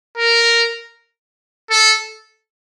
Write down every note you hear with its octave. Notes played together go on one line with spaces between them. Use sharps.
A#4
A4